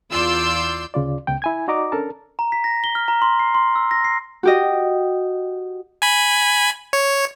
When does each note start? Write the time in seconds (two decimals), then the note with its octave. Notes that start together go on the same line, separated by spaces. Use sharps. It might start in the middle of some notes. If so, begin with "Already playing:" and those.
0.11 E2 F4 D5 C6 E6 G6
0.94 D2 C#3 F4 D5
1.27 C#2 C#3 B3 G5
1.42 E4 G#5 G#6
1.68 D#4 F#4 D5 D#5 A#5 D6
1.92 C#4 D4 A4 A#4 A5
2.39 A#5
2.52 B6
2.64 A#6
2.84 G7
2.95 F6
3.08 A#5
3.22 C6
3.40 C7
3.55 C6
3.76 E6
3.91 A#6
4.04 C7
4.43 F#4 G4 D#5
6.02 G#5 B5
6.93 C#5